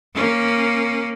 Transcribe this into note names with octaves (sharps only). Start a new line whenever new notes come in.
A#3 C#4